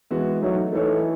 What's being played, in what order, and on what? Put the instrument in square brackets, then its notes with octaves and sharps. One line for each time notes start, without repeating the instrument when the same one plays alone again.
[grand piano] E3 G#3 B3 F#4
[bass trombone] F#3 [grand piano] A3 D#4 A4 C#5
[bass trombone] E3 [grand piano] A3 D#4 A4 C#5